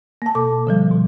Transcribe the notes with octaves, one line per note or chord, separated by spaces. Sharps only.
A#3 A5
B2 A4 D6
D3 F3 G3
B2